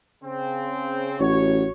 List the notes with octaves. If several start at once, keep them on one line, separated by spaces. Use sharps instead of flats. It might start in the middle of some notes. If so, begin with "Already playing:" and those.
C#3 C4
A1 F#4 C#5